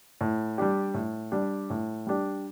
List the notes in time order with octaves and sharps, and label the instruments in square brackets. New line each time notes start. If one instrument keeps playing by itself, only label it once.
[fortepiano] A2
G3 D4 G4
A2
G3 D4 G4
A2
G3 D4 G4